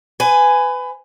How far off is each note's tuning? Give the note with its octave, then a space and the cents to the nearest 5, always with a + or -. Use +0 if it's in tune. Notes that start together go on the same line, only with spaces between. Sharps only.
B4 +25 G#5 +0